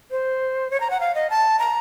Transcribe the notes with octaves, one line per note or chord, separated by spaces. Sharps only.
C5
C#5
A#5
F#5
F5
D#5
A5
A#5